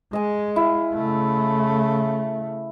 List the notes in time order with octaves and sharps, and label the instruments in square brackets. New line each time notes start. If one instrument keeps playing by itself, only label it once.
[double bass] G#3 [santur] D#5 G#5
[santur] E4 F5
[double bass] C#3 A3